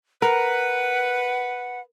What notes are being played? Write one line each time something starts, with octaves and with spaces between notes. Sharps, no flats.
A#4 B4 F#5